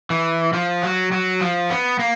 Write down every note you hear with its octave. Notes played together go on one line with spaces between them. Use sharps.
E3
F3
F#3
F#3
F3
B3
A#3